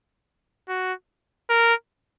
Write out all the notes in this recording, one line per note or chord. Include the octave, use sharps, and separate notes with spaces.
F#4
A#4